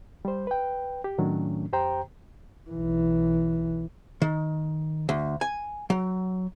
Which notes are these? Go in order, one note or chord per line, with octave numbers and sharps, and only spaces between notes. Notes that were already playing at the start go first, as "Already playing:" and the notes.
G3 C5
B4 G5
G4
A2 D#3 F#3 A3 C#4 D4
F2 G4 C5 G5 A#5
B1 E3
D#3
D2
G#5
F#3